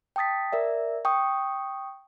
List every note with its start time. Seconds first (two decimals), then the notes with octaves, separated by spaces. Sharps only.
0.16 G5 A5 D#6 A6 B6
0.52 A#4 D5 E5
1.05 G5 C#6 D#6